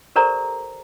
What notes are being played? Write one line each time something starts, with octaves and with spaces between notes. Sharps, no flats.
G4 A4 A#4 C5 D5 A#5